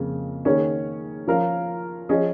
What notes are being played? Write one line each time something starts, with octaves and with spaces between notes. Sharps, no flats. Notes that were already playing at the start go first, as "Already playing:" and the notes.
Already playing: F2 C#3 A#3
D#3 A#3 C#4 G#4 C#5
F3 C#4 A#4 F5
F3 C#4 G#4 D#5